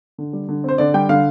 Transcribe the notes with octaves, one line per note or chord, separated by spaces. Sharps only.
D3
G3
D3
C4 C5
D3 D5
G3 G5
D3 F5